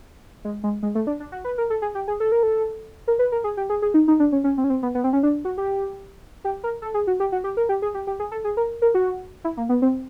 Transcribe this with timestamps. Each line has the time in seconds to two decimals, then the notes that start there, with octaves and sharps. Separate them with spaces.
0.45 G#3
0.63 G#3
0.83 G#3
0.95 A3
1.07 D4
1.20 D4
1.32 F#4
1.45 B4
1.58 A#4
1.70 A4
1.82 G#4
1.95 G4
2.08 G#4
2.20 A4
2.32 A#4
2.43 A4
3.08 A#4
3.19 B4
3.32 A#4
3.44 G#4
3.57 G4
3.70 G#4
3.82 G#4
3.94 D#4
4.08 D#4
4.20 D4
4.32 C#4
4.44 C#4
4.58 C4
4.64 C#4
4.70 C4
4.83 B3
4.95 B3
5.04 C4
5.13 C#4
5.23 D4
5.45 F#4
5.58 G4
6.44 G4
6.64 A#4
6.82 A4
6.94 G#4
7.07 F#4
7.20 G4
7.32 F#4
7.44 G4
7.57 A#4
7.69 G4
7.82 G#4
7.94 G4
8.07 G4
8.20 G#4
8.32 A4
8.44 G#4
8.57 A#4
8.82 A#4
8.94 F#4
9.44 E4
9.57 A#3
9.69 B3
9.82 C4